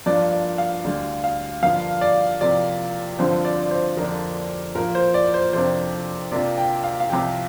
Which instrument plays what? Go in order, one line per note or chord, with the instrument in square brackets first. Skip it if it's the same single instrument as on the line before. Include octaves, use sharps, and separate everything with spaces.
[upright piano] G2 F3 A#3 D4 F4 [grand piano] D5
[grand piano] D5
F5
[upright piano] D2 D3 G3 [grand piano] D5
[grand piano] F5
[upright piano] G2 D3 F3 A#3 [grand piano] F5
[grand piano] D5
[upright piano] C3 F3 A#3 [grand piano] D5
[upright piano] G2 D3 F3 C4 [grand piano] C5
[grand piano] D5
D5
C5
[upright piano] F2 D3 A#3 D4 [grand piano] A#4
[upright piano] A#2 F3 A#3 [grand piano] A#4
[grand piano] C5
D5
C5
[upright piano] F2 C3 A#3 D4 [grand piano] C5
[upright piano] C3 A#3 D4 F4 [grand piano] D5
[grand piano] G5
F5
F5
[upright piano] C2 C3 F3 [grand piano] G5